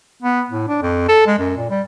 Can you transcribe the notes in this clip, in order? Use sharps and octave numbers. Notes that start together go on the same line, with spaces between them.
B3
A2
D4
F2
A4
G#3
F#2
A#2
G3